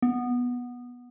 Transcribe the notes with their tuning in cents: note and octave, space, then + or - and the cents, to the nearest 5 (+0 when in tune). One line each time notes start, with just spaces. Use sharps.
B3 -10